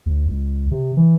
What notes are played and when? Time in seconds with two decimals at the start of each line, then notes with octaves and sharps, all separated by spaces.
0.06 D2
0.28 C#2
0.71 C3
0.97 E3